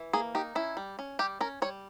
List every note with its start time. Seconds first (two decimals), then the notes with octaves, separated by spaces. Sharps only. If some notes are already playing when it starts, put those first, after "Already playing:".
Already playing: E3
0.13 A#3 G#4
0.35 D#4 G4
0.55 C#4 E4
0.77 G3
0.99 C#4
1.19 G3 G4
1.41 C#4 A#4
1.62 G3 C#5